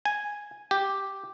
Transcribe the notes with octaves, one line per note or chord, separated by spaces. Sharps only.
G#5
G4